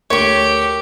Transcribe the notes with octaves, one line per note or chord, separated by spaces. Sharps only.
D2 G4 A#4 C#5 C#6